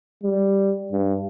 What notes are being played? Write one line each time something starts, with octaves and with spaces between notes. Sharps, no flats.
G3
G2